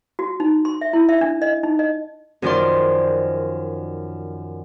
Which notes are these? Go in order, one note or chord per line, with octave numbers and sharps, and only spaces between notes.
F#4
D#4
C6
E5
E4
E5
D4
D#5
D#4
D#5
F#2 D#3 F3 F4 D5 C6